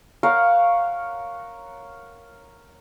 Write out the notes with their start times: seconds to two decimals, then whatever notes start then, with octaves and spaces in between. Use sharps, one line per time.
0.23 A#4 C#5 F5 F#5